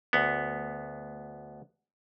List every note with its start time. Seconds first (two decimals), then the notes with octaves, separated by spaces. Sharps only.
0.13 D2 B3